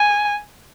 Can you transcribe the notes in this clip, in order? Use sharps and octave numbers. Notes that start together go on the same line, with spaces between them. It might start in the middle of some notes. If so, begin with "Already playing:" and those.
Already playing: G#5